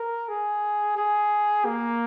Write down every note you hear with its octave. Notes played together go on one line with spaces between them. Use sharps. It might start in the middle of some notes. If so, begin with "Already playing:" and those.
Already playing: A#4
G#4
G#4
A#3